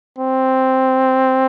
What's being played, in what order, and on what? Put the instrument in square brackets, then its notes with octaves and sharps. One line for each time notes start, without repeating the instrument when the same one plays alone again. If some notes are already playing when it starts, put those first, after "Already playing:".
[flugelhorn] C4